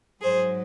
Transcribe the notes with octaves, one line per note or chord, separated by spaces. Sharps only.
G#2 F#3 G#4 C5